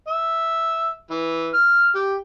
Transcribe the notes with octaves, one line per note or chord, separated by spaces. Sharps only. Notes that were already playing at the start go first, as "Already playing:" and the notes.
E5
E3
F6
G4